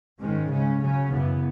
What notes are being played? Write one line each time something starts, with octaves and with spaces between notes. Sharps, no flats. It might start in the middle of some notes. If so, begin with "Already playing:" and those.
G#2 D#3 G#3 C#4
C#3 G#3 C#4
C#3 F#3 C#4
F#2 C#3 E3 B3